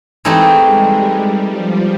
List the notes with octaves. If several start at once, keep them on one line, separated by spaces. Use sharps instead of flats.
E3 G#3 A3 C4 D#4 G4
G3
F3